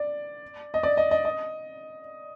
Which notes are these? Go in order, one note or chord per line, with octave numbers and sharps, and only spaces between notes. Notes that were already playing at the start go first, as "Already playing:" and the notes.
Already playing: D5
D#5
D5
D#5
D#5
D#5